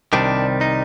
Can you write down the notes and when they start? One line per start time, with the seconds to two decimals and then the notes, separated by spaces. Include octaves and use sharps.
0.13 C2 C3 D#3 G3 D4
0.61 D#4